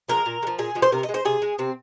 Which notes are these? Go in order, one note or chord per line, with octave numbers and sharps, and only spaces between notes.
F3 G#3 A#4
A#2
G#3
F3
A#2 G#4
F3 G#3
C5
C3 A#4
D#5
G#3
C5
C3 G#4
G#3
C3 C4